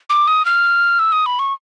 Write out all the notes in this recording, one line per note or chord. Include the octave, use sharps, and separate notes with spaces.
D6
D#6
F6
E6
D#6
B5
C#6